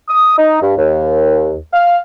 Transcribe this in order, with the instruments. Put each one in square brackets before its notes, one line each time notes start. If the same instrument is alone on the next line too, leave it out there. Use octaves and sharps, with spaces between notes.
[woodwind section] D#6
D#4
G2
D#2
F5